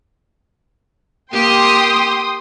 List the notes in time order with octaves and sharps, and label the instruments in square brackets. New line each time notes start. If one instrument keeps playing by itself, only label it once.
[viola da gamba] A#3 G4 [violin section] G5 C6 D#6